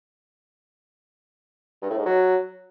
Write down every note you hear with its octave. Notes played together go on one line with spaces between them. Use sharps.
G2
A2
G#2
F#3